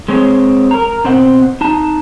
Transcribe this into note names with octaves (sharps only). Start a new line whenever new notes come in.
G#3 C4 G#4 C#5
A#4 A#5
B2 C4 C5 F#5
D#4 A5